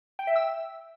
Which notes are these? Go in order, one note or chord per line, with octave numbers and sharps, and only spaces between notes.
G5
E5
E6